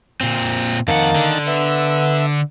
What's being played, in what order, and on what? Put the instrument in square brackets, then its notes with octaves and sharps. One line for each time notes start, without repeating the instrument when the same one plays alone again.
[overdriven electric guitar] A#2 C4
[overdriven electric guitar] F2 F#5 [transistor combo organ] D#3 A5 [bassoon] A#3
[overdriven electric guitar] D3
[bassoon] B3 [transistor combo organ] E5